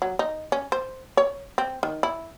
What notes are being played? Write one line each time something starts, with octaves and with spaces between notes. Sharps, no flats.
F#3
D#4
C#4
C5
C#5
C4
D#3
E4